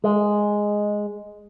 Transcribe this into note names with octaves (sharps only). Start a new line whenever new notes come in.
G#3